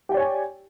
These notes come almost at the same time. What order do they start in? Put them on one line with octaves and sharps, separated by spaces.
G4 G5 D5 C#5 G#5